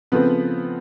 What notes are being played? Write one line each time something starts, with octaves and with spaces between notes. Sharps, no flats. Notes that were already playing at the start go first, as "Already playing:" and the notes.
C#3 F3 A3 B3 C4 B4